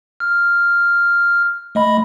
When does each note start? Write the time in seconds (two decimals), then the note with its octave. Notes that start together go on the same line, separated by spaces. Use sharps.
0.20 F6
1.75 A3 D#5 B5